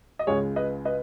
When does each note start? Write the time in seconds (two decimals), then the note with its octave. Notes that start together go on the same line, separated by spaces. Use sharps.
0.19 D#5
0.27 C#2 C#3 G#3 G#4 C#5
0.56 B4 D#5
0.85 B4 D#5